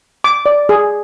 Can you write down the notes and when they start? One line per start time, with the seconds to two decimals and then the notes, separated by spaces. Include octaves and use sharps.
0.24 D6
0.46 D5
0.69 G#4